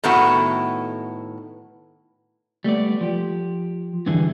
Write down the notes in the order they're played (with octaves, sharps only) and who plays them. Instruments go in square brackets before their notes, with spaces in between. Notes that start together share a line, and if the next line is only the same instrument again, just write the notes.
[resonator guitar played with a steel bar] A2 D#3 B3 E4 F#4 A4
[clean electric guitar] G3 A3 B3 D5
F3 G4
E2 G2 D3 E3 G3 G#4